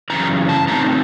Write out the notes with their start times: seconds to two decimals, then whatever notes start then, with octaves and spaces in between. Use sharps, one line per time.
0.10 F#2 C#3 E3 A#5
0.49 A5
0.68 A2 E3 G#3 C4 D#4 A#5